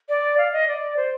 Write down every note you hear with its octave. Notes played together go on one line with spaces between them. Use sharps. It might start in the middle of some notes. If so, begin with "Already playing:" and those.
D5
F5
D#5
D5
C5